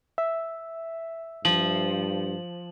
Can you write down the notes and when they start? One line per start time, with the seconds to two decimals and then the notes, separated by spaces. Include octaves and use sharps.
0.18 E5
1.45 G2 F3 F#7